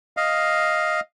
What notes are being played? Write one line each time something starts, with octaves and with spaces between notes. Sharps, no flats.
D#5 F5